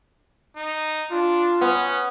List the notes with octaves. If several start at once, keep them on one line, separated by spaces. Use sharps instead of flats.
D#4
D4 F4
B3 C#4